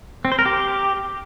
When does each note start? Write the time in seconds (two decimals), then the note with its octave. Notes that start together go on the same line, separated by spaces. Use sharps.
0.25 C4
0.32 C5
0.39 A#4
0.46 G4